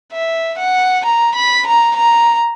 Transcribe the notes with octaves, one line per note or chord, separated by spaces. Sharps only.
E5
F#5
A#5
B5
A#5
A#5